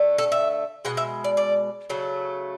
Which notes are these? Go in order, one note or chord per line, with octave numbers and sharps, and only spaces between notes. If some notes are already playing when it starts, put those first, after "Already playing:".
Already playing: D3 A3
A4
E5
B2 G#3 F#5
E5
D5
D5
C#3 F#3 A3